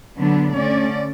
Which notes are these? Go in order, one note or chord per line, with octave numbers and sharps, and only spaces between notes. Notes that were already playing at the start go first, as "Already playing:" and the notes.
D3 F#3 B3 D4
D3 A3 C#4 D5